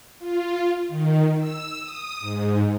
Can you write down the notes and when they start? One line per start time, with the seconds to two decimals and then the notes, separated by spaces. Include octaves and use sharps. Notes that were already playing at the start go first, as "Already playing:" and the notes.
0.19 F4
0.89 D#3
1.38 E6
1.81 D#6
2.20 G#2